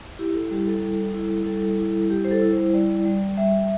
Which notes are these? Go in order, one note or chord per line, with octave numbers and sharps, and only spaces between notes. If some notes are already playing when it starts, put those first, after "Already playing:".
E4 G4
A4
G3 G4
A4
G3
E4
G3 A4
E4
G3 G4
C5
A4
E4
C5
G3 D5
G3
G3 E5